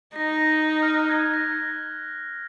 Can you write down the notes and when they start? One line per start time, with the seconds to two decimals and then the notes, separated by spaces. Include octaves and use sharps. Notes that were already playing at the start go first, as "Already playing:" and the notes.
0.16 D#4 A#6
0.83 F6
0.96 F#6
1.09 G#6
1.34 A#6